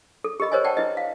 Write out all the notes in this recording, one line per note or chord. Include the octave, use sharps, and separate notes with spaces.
A4
G4 A#4 D#5 B5
A#4 C5 C#5 D#5 G#5
D5 F#5 G5 A5
E4 B4 D#5
F5